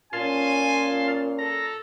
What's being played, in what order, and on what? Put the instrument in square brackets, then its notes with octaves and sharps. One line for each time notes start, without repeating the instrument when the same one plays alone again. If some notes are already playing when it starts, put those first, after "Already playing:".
[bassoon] A#2 [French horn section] C#4 F4 [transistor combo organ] F5 A5 C6 [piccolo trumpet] G#5
[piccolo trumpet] A4 [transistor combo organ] A#5